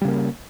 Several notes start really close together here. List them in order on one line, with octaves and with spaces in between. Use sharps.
G3 C#3 A#3